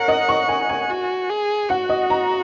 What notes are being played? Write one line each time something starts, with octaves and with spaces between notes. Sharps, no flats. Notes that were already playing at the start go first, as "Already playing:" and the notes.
Already playing: A#4 C#5 F#5
D#5
C#6
G#5
G#5
F#4
G#4
F#4 F#5
D#5
A#5